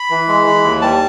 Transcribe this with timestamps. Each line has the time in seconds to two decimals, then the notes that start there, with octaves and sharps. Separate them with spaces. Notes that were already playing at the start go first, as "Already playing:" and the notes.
Already playing: B5
0.10 E3
0.28 G#3
0.46 E3
0.64 D#2
0.82 G3 A5